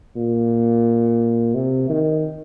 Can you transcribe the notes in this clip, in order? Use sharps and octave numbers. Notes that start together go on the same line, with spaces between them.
A#2
C3
D#3